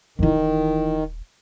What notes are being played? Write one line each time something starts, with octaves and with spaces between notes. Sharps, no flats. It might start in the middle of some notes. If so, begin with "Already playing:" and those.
D#1 D#3 E3 E4